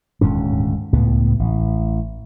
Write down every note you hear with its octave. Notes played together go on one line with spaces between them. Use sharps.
D#1 D2 G#2 C#4
C#2 A2 B3
A1